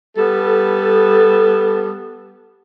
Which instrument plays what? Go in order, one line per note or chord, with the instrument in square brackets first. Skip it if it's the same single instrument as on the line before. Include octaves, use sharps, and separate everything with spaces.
[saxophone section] G3 B3 A4